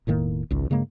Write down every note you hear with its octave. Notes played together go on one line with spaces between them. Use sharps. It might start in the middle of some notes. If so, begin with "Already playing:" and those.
E1 A2 D#3 A#3
G#1 C#2
G2 C#3 G#3 A#3